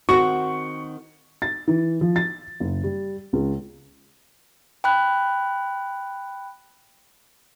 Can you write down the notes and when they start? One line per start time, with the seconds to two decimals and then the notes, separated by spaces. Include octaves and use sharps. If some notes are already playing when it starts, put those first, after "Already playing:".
0.09 D#3 C4 F#4 C#6
1.42 A6
1.67 E3
2.01 F3
2.16 A6
2.60 F#1
2.83 G3
3.33 C#2
4.84 G5 B5 F#6